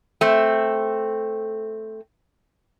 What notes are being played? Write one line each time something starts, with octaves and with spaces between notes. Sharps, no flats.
A3 C4